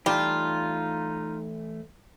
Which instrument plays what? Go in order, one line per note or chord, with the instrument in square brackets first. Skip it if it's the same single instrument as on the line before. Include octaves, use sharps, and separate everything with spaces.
[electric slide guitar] E3 A3 A5 [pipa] G3 [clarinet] D#4 [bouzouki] F4